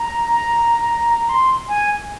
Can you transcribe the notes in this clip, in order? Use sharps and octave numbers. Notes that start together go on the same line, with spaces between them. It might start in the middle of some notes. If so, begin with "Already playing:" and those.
Already playing: A#5
A#5
C6
G#5